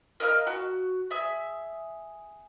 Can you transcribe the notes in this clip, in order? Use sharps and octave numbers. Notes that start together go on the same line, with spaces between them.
A#4 D#5 F5 F6
F#4
G#4 E5